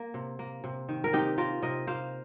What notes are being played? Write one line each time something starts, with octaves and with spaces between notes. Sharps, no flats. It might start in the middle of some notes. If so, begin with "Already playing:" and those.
Already playing: A#3
C3
A#3
C3
D#3
A#4
C3 D#4 G4
A#3 F4 A#4
C3 A#4 D#5
A#3 C5 F5